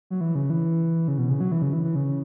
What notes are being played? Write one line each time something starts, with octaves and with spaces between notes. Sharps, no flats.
F#3
E3
C#3
E3
C#3
B2
C#3
F#3
E3
C#3
E3
E3
C#3